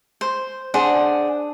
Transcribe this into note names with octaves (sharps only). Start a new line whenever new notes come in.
C5
D4 G#4 C5 F#5